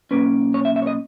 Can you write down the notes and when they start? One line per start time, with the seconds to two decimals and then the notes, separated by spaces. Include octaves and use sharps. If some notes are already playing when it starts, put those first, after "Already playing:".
0.11 B1 A#2 A#3 C#4 B4
0.54 C#5
0.65 E5
0.76 E5
0.82 C#5
0.87 D#5